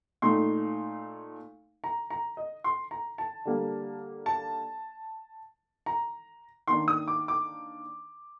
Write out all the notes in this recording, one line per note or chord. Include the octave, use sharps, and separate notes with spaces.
A#2 A3 D#4 C6
A#5
A#5
D#5
C6
A#5
A5
D3 G3 A#3 D4
A5
A#5
D#3 A#3 D4 C6
D#6
D6
D6